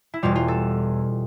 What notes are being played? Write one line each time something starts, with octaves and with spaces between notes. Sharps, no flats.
E4
E1 E2 B2 G3 F4
F4
A4